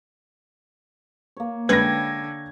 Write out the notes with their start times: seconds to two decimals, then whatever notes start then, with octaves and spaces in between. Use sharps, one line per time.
1.37 A#3 C#5
1.69 D3 G#3 C#4 B4 G5 B5 G#6 A#6